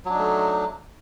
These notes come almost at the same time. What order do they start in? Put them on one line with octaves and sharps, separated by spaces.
F#3 D4 D#4 A3